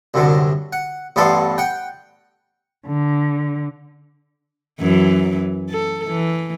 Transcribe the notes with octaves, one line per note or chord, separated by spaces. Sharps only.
C2 F#2 D3
F#5
A1 G2 B3 A4 D5 C6
F#5 G5
D3
F#2 E3 F#3
A4
E3